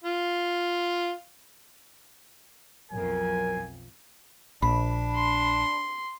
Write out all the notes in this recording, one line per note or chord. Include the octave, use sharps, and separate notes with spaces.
F4
B1 F2 F#3 A#4 G#5
A#1 D4 B5
C6